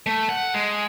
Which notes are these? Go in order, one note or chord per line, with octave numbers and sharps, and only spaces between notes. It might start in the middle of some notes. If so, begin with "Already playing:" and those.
A3
F#5
G#3